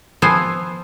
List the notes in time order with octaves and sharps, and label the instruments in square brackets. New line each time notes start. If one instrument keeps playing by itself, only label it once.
[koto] F3 B3 C4 C5 G#5